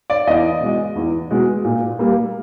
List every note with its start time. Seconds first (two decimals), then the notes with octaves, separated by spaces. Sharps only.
0.10 D5
0.27 E2 D#5
0.61 B2 G#3
0.95 E2
1.31 B2 G#3
1.64 A#2
1.99 G3 A#3